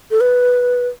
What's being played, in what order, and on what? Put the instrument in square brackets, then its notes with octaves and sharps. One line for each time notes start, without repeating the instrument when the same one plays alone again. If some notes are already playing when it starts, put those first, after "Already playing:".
[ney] A4
B4